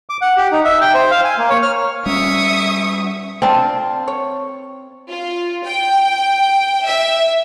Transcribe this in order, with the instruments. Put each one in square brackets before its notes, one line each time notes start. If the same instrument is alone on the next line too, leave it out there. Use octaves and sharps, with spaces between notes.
[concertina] D6
F#5
G4
D#4
E5
G5
C5
F5
G#5
A#3
C#5
F6
[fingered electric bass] G3 C#4 [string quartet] E5 C#6 D#6
[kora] C4 [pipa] D4 F4 A5
[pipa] C#5
[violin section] F4
G5
E5